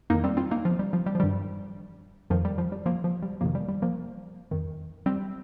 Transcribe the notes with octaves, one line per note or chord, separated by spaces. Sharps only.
F2 D#3 A#3 D#4
G3 C4
C4 F4
A#3 D#4
F3
G3
F3
G3
F3
G2 D#3 G3
F2 D#3 F3
G3
F3
G3
F3 A#3
F3
G3
F2 C3 D#3 F3 A#3
G3
G3
F3 A#3
F2 D#3
G3 C4